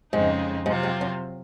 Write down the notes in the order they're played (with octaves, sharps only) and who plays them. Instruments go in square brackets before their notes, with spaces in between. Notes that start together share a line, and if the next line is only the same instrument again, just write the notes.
[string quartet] F2 C#3 G#3 C4 D#4 [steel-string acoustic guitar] G#2
[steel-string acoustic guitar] G#2 [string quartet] C3 F#3 C4 F4
[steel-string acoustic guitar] G#2
F#2